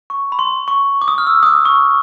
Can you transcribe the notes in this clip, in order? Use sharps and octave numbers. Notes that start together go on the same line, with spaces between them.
C#6
B5
C6
C#6
D6
D#6
F6
E6
D#6
D6
C#6